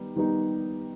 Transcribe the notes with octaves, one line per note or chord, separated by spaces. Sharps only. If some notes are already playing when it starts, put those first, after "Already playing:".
Already playing: D#3 G3 B3 D#4
D#3 G3 B3 D#4